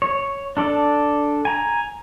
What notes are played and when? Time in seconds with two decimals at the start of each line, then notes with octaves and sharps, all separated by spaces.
0.02 C#5
0.57 D4 A4 D5
1.45 G#5 A#5